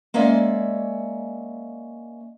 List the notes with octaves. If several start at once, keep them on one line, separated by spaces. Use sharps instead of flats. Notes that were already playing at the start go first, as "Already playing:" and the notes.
G#3 A#3 C#4 D5 E5